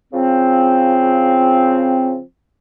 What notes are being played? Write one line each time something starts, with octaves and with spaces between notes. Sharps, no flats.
C#3 F3 C4